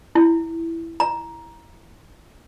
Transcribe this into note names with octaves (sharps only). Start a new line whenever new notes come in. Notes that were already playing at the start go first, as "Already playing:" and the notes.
E4
A#5